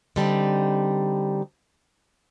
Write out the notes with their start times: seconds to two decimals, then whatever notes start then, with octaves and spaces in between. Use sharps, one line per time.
0.16 D3 G3 C4 D#4